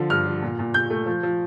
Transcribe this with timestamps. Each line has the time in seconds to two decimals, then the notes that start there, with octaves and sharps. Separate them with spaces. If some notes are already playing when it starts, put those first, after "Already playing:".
Already playing: D3 F3
0.10 G2 F6
0.26 F3
0.42 A#2
0.59 A#2
0.74 A#2 G6
0.90 A3
1.06 F3
1.23 F3